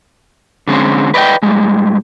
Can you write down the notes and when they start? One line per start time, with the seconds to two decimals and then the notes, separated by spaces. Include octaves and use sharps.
0.68 D3 G#3 C4 C#4
1.14 B4 D5 D#5 F5 G5
1.42 A2 G3 G#3